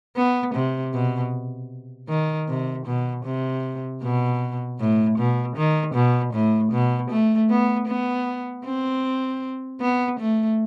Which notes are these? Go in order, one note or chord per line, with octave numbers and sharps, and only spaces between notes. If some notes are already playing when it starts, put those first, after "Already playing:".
B3
C3
B2
D#3
C3
B2
C3
B2
A2
B2
D#3
B2
A2
B2
A3
B3
B3
C4
B3
A3